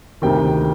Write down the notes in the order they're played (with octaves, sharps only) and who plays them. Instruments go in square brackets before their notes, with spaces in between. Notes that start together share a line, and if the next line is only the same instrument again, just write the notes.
[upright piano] D2 C3 D#3 G5